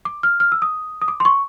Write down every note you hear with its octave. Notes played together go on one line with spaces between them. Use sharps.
D6
F6
F6
E6
D#6
D#6
D6
C6
C#6